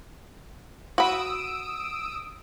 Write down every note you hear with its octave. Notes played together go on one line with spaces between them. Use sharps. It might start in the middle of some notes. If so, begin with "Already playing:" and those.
F#4 B5 D#6 E6 D7